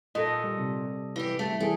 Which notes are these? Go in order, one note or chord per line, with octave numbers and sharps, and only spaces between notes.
A#2 A4 D#5
G3
C3
E3 G4
A3
E3 G3 A3 G#4